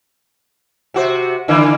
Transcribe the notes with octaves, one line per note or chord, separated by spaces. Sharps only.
C3 F#4 C5
D3 E3 A#3